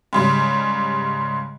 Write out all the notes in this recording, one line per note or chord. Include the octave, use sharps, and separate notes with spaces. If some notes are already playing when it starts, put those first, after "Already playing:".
G#2 C#3 G3